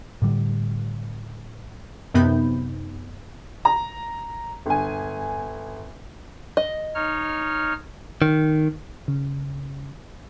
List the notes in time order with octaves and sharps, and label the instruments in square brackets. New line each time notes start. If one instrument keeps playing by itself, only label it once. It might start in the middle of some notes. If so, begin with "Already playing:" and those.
[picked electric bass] A2 D3 G3
[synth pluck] F#2 C3 B3 D#4 B5 G6
[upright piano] A#5
G1 G#5
[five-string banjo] D#5
[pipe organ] D#4 C#5 F6
[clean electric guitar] D#3
[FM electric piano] C#3